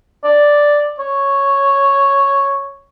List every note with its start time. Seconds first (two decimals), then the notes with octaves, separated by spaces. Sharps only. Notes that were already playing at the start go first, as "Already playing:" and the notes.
0.24 D5
0.99 C#5